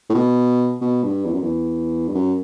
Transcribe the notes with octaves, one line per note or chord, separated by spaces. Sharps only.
A2
B2
B2
G2
E2
F#2
E2
G2
F#2